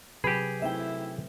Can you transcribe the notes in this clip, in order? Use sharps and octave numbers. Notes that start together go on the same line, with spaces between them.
C3 F#3 G4 G#4 B4 B5
A3 C4 E4 E5 G5